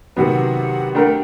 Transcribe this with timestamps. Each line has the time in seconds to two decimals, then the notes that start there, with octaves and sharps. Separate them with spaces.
0.16 C3 D#3 F#3 B3 F#5
0.95 A3 D4 G4 A#4 F#5